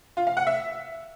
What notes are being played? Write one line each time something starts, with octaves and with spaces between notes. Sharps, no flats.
F4
F5
F#5
E5